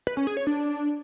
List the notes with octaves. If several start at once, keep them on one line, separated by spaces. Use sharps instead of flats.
B4
C#4
G#4
C#5
D4